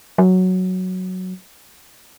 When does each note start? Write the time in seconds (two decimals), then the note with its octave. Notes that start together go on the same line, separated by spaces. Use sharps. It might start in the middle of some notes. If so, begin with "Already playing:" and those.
0.18 F#3